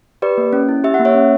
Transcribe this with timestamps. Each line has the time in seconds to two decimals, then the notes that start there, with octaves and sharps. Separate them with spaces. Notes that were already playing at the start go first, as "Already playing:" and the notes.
0.22 G4 B4 D5
0.38 A#3
0.53 C#4
0.69 E4
0.84 G4 E5
0.94 F#5
0.99 A#3
1.05 C#5 E5
1.15 C#4